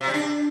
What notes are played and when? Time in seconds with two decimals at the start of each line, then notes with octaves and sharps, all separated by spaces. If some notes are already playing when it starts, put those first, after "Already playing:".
0.01 C3
0.07 G3
0.14 D4